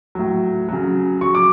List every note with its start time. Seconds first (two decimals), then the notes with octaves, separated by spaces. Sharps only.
0.15 A2 F#3
0.69 C#3 F#3
1.21 C#3 F#3 C#6
1.35 D6